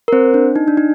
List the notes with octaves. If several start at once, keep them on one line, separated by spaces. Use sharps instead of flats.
A#4
C4 C5
D4
D#4
D4
D#4